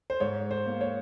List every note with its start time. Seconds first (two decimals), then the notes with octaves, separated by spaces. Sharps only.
0.10 C5
0.20 G#2 C#5
0.51 C5
0.66 A#3
0.81 C#5